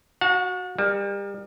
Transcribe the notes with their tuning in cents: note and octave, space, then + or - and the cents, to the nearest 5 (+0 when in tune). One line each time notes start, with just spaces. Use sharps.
F#4 +0 F#5 -40 A5 +5
G3 +35 A#4 +15